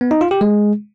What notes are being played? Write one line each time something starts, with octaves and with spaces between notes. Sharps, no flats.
B3
D#4
F4
G4
G#3